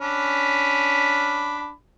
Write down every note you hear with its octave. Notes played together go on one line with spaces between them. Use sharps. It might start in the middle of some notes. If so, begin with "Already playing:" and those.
C#4 D4 B5